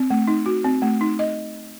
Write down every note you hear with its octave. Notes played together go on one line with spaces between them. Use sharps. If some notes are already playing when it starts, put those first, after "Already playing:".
Already playing: C4
A3
D#4
F#4
C4
A3
D#4
D#5